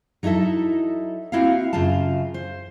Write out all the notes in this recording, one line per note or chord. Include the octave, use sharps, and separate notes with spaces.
F#3 D#4 E4 A4 E5
A#3 C4 E4 F#4 E5 F5
F#2 C#3 F4 F5 A5
C5